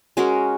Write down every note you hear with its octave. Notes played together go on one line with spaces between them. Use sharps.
G#3 C#4 F#4 A#4